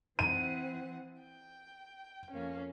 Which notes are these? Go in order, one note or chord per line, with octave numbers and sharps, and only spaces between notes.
E3 C4 F#5 D#7
G5
F2 A#3 C#4